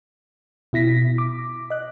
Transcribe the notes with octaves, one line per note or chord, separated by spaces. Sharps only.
B2 E4 A#6 B6
D6
D#5 F#6